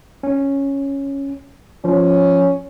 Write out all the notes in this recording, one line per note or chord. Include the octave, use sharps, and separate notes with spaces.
C#4
F3 C#4